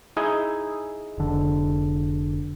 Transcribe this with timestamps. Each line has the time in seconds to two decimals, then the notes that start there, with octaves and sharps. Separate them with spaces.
0.17 D#4 E4 G#4
1.18 F1 D3